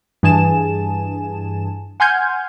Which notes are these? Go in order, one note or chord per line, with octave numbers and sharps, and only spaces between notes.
G2 E3 G#4 G#5 A5 E7
F#5 G#5 C6 F6 G6 G#6